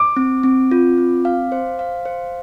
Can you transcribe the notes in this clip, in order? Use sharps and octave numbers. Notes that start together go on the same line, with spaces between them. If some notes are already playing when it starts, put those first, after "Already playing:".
Already playing: D6
C4
C4
F4
C4
F5
C5
F5
C5